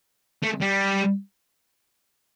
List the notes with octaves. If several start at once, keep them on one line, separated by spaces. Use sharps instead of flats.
A3
G3